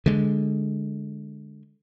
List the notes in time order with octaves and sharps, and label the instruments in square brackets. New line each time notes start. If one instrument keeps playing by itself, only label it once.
[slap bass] D3 G#3